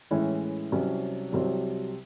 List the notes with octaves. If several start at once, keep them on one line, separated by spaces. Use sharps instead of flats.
A2 E3 G#3 C#4 E4
C2 C3 F#3 C#4
C2 C3 F#3 C4